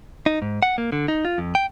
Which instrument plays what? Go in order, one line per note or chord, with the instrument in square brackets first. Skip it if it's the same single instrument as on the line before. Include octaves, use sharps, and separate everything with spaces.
[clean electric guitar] D#4
G#2
F#5
A#3
D3
D#4
F4
F2
G5